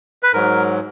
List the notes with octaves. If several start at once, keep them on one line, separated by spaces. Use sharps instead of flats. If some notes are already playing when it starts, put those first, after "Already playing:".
B4
G#2 F#3 A#4